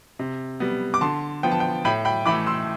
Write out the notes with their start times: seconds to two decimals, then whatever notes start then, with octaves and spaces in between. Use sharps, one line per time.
0.19 C3
0.60 G3 B3
0.94 D6
1.01 D3 A5 C6
1.43 F3 B3 G5
1.52 A5
1.60 G5
1.85 A2 G5 B5
2.05 G5 B5
2.26 E3 A3 B5 D6
2.46 C6 E6